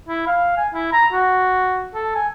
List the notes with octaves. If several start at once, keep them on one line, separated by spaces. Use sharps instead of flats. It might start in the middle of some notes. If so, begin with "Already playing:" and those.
E4
F5
G#5
E4
A#5
F#4
A4
G#5